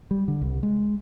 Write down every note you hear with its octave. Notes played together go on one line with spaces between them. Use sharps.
G3
D3
C2
G#3